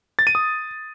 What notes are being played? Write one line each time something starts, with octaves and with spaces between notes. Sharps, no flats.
A6
D#7
D#6